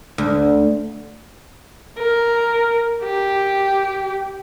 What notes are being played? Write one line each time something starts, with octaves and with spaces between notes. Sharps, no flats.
D2
A#4
G4